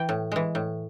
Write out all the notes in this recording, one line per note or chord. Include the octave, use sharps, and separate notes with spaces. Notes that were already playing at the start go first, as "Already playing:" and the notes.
Already playing: E3 G5
A2
E3 G#3
A2